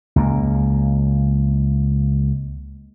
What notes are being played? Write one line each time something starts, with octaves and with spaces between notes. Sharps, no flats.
C#2 A#3